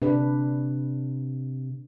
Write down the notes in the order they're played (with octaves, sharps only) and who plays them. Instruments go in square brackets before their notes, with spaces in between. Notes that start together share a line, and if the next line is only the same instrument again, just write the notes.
[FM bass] C3 [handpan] D4 B4